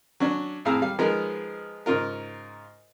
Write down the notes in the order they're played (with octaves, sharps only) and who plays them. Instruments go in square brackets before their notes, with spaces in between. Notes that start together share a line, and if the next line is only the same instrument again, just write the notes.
[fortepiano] F#3 C#4 D4
F2 A2 G#4 F5 A#5 E6
G3 F5
F3 G#3 B3 D#4 A#4
G#2 C#3 F4 A#4